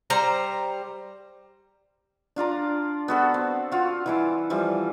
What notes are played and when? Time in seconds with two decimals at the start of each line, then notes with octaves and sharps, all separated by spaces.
0.10 G3 C5 A#5
2.36 D4 F4 D5 A#5
3.08 B3 F#4 A4
3.34 C4
3.72 F4 F#4
4.06 E3 E4 D6
4.50 E3 F3 G3